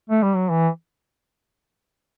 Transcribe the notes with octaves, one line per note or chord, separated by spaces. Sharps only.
A3
G3
F#3
E3